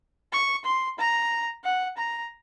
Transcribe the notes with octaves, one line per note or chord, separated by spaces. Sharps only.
C#6
C6
A#5
F#5
A#5